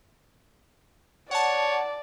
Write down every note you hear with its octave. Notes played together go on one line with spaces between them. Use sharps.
C#5 D5 F#5 A5